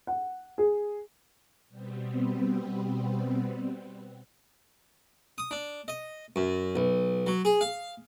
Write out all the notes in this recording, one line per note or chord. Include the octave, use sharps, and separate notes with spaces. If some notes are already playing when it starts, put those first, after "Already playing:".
F#5
G#4
B2 G3 B3 C4
D#6
D4
D#5
F#2
B1
F#3
G#4
F5